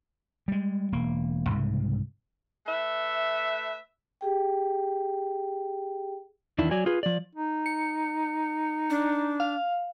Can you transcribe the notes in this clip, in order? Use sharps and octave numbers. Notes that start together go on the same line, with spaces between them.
G3 G#3
E1 A#3
C2 G#2 C#3
A3 B4 E5
G4 G#4 G5
E2 D#3 D4 E4
F#3 D5 G#5
F4 G#4 B4
F3 D5
D#4
C#7
D4
F5